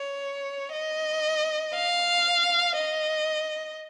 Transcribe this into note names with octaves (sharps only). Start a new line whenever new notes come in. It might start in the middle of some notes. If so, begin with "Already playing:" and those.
Already playing: C#5
D#5
F5
D#5